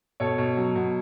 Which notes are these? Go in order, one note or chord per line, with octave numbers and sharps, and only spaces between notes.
B2 A4 C#5
B2
F#3
B2